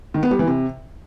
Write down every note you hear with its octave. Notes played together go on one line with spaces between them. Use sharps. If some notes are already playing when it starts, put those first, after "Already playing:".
D#3
B3
G3
E3
C3